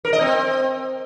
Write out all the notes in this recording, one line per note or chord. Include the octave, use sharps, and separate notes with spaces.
A#4
D#5
C4